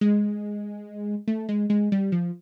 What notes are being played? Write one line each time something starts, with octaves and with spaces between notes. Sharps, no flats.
G#3
A3
G#3
G#3
G3
F3